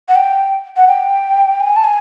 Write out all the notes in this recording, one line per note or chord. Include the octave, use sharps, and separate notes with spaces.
F#5
G5
F#5
G5
G#5
A5
G#5